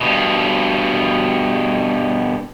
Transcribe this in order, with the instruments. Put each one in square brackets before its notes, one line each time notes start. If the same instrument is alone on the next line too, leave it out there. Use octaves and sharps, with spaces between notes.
[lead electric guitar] G2 B2